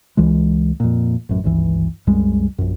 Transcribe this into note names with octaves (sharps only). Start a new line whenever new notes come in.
C#2 E3 G#3
F2 A#2
A1 F#2
G#1 C#2 G2 E3
C2 F#2 G3 G#3
A#1 F#2